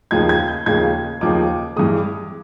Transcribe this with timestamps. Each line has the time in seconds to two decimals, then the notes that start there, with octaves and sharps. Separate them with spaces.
0.11 D#2 C#3 F3 A#3 D#4 G#6
0.29 G#6
0.48 G6
0.66 D#2 C#3 F3 A#3 D#4 G#6
1.21 D#2 C#3 F3 A#3 D#4 D6
1.76 G2 E3 G#3 D#6